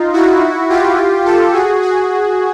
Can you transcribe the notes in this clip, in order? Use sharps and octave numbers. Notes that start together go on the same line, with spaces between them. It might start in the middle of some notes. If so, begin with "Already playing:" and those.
Already playing: D#4 F4
E4 F#4
F4 G4
G4 A4
F#4 G#4
F#4 G#4